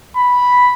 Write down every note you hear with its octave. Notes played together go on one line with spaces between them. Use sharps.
B5